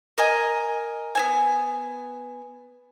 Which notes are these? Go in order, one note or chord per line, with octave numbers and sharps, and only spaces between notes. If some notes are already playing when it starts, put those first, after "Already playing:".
A#4 D#5 G#5
B3 C4 G#5